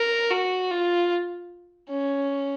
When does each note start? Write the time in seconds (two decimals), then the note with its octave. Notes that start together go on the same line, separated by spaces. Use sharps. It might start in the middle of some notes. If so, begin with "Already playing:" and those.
Already playing: A#4
0.31 F#4
0.71 F4
1.90 C#4